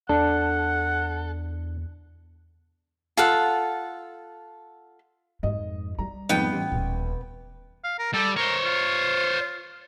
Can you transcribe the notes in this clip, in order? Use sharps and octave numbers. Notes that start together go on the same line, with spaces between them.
E2 D4 A4 F#5
F4 A4 F#5
F2 G#2 D#5
G3 A#5
F2 G#2 B3 G5
A1
D#1
F5
A#4
G3 A4
A#4 C5 C#5
F4